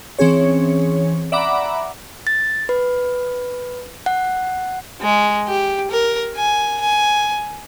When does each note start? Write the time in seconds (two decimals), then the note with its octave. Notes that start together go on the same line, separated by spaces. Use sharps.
0.19 E3 C4 C#4 G#4 C#5
1.32 D5 E5 F#5 A#5 B5 D6
2.27 A6
2.69 B4
4.06 F#5
5.01 G#3
5.47 G4
5.91 A#4
6.36 G#5
6.81 G#5